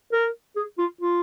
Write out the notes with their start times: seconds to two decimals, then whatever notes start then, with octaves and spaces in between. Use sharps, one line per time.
0.12 A#4
0.56 G#4
0.78 F4
1.01 F4